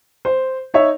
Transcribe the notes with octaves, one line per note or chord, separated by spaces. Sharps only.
C5
D#4 C#5 E5